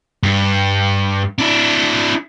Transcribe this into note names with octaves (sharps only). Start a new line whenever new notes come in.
G2
D4 E4